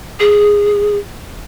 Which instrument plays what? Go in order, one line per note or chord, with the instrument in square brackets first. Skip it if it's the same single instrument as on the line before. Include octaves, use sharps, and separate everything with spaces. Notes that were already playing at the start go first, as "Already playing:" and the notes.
[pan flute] G#4